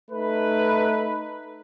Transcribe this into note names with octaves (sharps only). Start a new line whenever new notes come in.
A3 D#4 B4